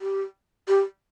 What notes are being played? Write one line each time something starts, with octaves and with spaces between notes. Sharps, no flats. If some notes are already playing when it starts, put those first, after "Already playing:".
G4
G4